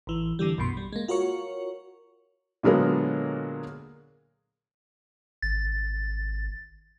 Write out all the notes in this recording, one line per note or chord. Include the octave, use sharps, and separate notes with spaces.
A1 E3
A2 D3 E3 G3
A#1 F#2 B2 B5 C6
G3
G#3 A#3
F4 F#4 A#4 C#5 C#6
A#2 D3 F#3 G#3 A#3 B3
G#1 A6